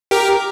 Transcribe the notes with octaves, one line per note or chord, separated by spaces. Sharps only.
G4 A#4